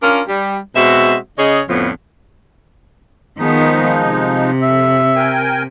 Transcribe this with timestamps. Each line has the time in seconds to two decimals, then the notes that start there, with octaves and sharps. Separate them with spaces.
0.03 C#4 D4 F4 A#4
0.29 G3
0.76 B2 G#3 C4 F#4 E5
1.39 C#3 G#4 C#5 D#5
1.69 F2 A2 D3 F3 B3
3.39 D#3 F3 G#3 B3 D#4
4.05 C3
4.62 F2 E5
5.16 A#4 G5 G#5